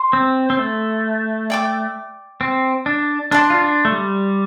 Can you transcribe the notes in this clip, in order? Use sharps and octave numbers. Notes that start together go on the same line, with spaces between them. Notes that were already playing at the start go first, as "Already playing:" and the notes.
Already playing: C5 C6
C4
C4
A3
D5 G5 D6
C4
D4
D4 D5 A5 C6
F4
D4
A3
G3